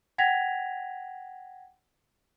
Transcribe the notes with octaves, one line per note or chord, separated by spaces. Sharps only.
F#5 G5 G#6 A#6 B6 F7